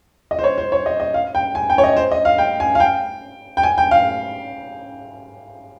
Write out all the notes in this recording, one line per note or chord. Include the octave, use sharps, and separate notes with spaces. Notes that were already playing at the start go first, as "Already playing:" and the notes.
D#5
C5
C#5
C5
C#5
D#5
D#5
F5
G5
G#5
G5
C#5
D#5
C5
D#5
F5
G5
G#5
F5
G5
G5
G#5
G5
F5